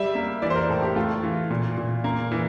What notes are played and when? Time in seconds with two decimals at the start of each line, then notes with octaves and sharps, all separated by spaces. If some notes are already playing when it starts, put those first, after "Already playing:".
Already playing: G3 E5
0.15 A#3
0.42 E3 D5
0.50 C5
0.56 A#4
0.69 A2 A4
0.82 G4
0.96 A3 F4
1.23 E3
1.50 A#2
1.77 A#2
2.04 A#3
2.32 E3